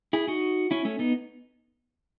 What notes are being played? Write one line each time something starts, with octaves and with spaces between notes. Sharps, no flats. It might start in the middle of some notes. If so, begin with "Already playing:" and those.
E4 G#4
D#4 F#4
C#4 E4
A3 C#4
B3 D#4